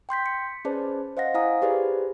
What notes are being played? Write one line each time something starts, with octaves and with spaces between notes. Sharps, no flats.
G5 C6 G6 B6
C#7
C#4 G#4 B4 C5 D5 A5
C5 D#5 F5 F#5 A#6
E4 C5 F5 G#5 A#5 D#6
G4 G#4 B4 C5 D5